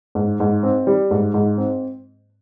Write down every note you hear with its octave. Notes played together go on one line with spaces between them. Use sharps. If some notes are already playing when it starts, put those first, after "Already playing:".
G#2
G#2
C4
G3
G#2
G#2
C4